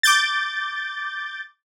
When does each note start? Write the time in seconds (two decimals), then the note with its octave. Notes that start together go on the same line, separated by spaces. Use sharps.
0.03 D6 G6 A6